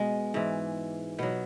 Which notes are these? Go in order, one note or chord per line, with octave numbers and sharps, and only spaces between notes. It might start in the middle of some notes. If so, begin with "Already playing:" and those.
Already playing: B2 G#3 B3
G#2 E3
B2 F#3 B3